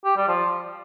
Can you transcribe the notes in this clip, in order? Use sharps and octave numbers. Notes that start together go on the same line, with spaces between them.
G4
G3
F3